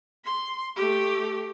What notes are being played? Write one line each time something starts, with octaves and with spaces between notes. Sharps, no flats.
C6
A3 G4